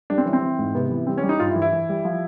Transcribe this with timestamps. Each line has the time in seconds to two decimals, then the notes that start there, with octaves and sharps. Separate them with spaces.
0.10 G3 D4
0.18 C4
0.25 E3 C#4
0.33 C4
0.42 E3
0.59 G#2
0.75 C3 B3
0.91 E3
1.07 G3 C4
1.18 C#4
1.23 G3
1.29 D#4
1.40 G2 F4
1.50 E4
1.56 E3
1.62 E4
1.73 E3
1.89 G3
2.05 F3